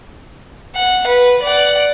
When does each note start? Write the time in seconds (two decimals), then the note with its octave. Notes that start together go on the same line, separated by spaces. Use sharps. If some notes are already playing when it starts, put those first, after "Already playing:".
0.76 F#5
1.07 B4
1.42 D5 F#5